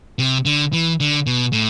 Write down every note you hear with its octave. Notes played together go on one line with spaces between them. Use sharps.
C3
D3
E3
D3
B2
A2